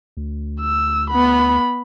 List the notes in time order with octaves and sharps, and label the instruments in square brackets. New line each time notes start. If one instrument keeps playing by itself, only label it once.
[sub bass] D2
[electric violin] E6
B3 B5